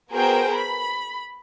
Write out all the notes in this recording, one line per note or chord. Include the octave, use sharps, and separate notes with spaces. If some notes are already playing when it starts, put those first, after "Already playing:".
B3 F#4 G#4 A#4 C5 G5
B5